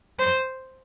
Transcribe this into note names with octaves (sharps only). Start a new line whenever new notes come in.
C5